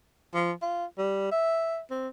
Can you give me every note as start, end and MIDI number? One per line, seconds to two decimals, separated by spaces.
0.35 0.52 53
0.62 0.86 65
0.98 1.31 55
1.31 1.79 76
1.91 2.09 60